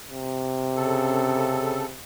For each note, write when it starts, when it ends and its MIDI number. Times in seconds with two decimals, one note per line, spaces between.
0.11 1.97 48
0.76 1.85 49
0.76 1.85 69